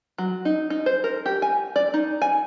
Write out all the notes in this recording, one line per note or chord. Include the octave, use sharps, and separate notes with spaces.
F#3
D#4
D#4
C5
A#4
G4
G#5
D5
D#4
G#5